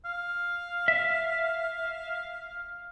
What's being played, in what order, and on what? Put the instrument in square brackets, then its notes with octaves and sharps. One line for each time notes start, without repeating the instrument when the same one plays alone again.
[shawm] F5
[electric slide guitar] E5